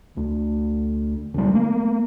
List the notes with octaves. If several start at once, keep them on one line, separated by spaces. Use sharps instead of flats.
D2
D2 G3
A3 A#3